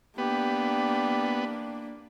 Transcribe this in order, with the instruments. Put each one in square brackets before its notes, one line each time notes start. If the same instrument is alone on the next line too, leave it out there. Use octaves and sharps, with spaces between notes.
[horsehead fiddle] A#3 D4 [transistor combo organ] B3 [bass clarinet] G4